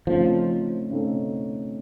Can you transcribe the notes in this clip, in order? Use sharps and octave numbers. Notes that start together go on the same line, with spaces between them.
C#3 F3 A3 C4 D#4 A4
C#3 A3 C4 D#4 A4